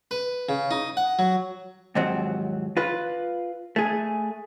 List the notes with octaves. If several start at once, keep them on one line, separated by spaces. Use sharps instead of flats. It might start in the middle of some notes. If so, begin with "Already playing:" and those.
B4
C#3
D#4
F#5
F#3
D#2 G#2 F3 F#3 C4
F4 B4
A3 G#4